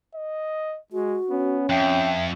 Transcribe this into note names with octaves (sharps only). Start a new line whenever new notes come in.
D#5
G#3 F#4
B3 C#4
F2 E5 G5